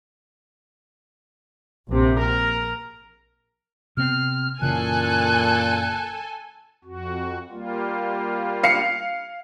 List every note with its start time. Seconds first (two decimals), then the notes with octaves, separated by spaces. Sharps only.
1.89 A#1 C3
2.21 A#4
3.97 C3 B3 C4 F6
4.62 F#1 A#2 C#3 E3 A4 G#5 F#6
6.85 F2 F#4
7.51 G3 A#3 F4
8.63 F5 C7 C#7